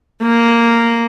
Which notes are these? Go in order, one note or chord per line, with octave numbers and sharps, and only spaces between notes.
A#3